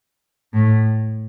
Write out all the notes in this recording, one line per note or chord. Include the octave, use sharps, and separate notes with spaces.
A2